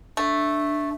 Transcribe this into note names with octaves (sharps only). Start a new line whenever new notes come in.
A3 D4